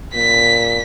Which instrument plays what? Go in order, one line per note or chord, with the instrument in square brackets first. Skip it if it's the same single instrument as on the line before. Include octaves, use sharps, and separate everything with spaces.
[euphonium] A#2 [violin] B6